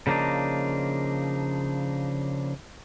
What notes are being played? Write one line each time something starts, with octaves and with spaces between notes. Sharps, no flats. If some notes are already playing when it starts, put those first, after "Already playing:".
C#3 F3 A#3 D4 D#4